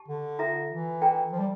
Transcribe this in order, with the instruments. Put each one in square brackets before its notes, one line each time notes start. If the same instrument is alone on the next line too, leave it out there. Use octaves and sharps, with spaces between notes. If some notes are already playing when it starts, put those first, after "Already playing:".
Already playing: [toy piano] G4 A5
[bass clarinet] D3
[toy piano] F4 A4 E5 A#5
[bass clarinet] E3
[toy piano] A4 D5 G5 A#5
[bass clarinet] F3
G3